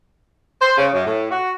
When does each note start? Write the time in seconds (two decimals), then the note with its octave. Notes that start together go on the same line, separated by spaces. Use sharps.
0.62 C5
0.77 C#3
0.93 F#2
1.06 A2
1.31 F#4